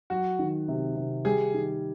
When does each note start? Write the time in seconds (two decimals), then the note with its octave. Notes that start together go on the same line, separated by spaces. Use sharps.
0.10 F#3 F#4
0.39 D#3
0.68 C3
0.96 C3
1.25 G3 G#4
1.54 D#3